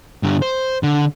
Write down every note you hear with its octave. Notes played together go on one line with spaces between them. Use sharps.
G2 D3
C5
D3